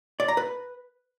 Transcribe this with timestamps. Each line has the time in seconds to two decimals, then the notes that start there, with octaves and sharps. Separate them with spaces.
0.20 D5
0.28 A#5
0.37 B4